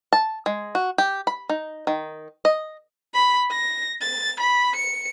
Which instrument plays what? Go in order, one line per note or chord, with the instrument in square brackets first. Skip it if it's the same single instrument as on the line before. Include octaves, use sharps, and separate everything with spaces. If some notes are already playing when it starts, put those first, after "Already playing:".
[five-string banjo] A5
G#3
F#4
G4
B5
D#4
D#3
D#5
[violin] B5
A#6
A6
B5
C#7